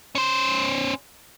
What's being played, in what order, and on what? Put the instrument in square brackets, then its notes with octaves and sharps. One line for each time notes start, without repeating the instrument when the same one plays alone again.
[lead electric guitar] C#4 C5